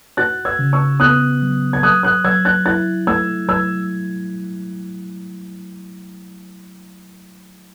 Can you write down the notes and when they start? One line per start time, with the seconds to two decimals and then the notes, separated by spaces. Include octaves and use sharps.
0.17 F#4 F#6 A6
0.45 E6 G#6
0.59 C#3
0.73 C#6 E6
1.00 B3 D#6 F#6
1.42 F#3
1.73 G#6
1.83 F#3 D#6 F#6
2.03 D#6 F#6
2.25 F#3 E6 G#6
2.45 F#6 A6
2.66 E4 F#6 A6
3.07 A3 E6 G#6
3.49 F#3 E6 G#6